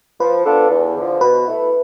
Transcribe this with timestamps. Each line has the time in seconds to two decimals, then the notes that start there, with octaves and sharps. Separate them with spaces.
0.20 F3 B4
0.45 B3 D4 F4 A4
0.70 E2
0.96 D3 F3
1.20 B2 B4
1.46 A3 E4